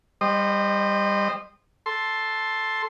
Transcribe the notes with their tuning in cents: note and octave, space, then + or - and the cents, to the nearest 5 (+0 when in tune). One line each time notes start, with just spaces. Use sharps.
G3 +20 C5 +0 D#5 -25
A4 +0 C6 +10